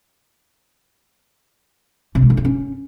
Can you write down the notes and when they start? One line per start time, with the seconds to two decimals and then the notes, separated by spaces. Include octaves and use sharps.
2.15 C3
2.22 G#3
2.30 D3
2.37 D#4
2.45 C#4